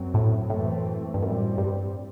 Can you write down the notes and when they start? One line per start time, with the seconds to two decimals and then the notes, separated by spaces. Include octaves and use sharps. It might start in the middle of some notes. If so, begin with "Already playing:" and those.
Already playing: F#2 F#3 C4
0.14 A2
0.50 F#2 A2 E3 A3 C4
1.14 G2
1.22 F#2 A2 G3 C4
1.58 G2